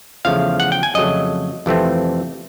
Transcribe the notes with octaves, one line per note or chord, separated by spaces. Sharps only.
E2 C#3 F3 A3 F5
F#5
G5
G#5
F2 C#3 F#3 A3 D#5
F2 C3 E3 A3 C4